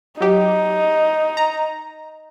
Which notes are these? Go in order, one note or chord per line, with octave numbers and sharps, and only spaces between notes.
F#3 D#4 G4
A#5